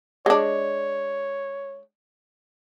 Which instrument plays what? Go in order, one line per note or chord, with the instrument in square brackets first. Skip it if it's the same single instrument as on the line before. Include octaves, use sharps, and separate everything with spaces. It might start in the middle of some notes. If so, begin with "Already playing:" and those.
[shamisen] G#3 D4 [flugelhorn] C#5